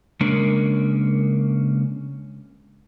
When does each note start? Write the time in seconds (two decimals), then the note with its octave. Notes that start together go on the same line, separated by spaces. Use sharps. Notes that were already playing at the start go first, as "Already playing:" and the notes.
0.21 C#3 G#3 A#3 C#4 D4 A#4